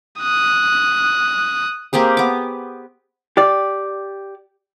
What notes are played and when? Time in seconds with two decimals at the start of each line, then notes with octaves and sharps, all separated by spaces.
0.20 D#6 F#6
1.93 A#3 C4 G4 G#4
2.17 B3 D6
3.37 G4 D5